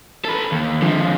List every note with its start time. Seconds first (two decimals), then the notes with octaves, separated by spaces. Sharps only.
0.25 A4 B4
0.52 D#2
0.82 D3 F3